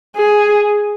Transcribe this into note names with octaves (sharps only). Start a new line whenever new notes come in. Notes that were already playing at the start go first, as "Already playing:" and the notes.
G#4